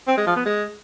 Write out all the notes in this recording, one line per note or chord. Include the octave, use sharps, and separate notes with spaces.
C4
G#3
F3
B3
G#3